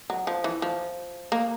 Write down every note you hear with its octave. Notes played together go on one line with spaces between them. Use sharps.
F#3
F3
E3
F3
A#3